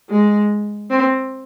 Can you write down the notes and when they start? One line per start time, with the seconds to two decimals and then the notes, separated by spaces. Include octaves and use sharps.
0.10 G#3
0.90 C4